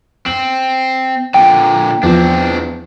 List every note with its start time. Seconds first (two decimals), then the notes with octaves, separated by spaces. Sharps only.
0.26 C4 F#7
1.34 A#2 D3 G5
2.03 E2 F3 C4 D4